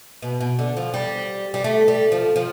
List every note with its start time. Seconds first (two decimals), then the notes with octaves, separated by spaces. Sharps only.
0.22 B2
0.40 B2
0.59 D3
0.77 F3
0.94 G3
1.54 G3
1.64 A3
1.88 G3
2.12 F3
2.36 F3